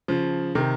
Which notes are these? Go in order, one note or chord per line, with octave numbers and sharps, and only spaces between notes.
C#3 F3
C3 D#3